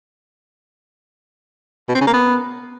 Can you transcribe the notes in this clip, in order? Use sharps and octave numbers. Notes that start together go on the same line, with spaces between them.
B2
C4
C#3
A#3
B3